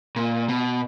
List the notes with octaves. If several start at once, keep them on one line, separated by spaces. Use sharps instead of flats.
A#2
B2